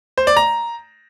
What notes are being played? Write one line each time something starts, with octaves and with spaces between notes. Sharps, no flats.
C5
D5
A#5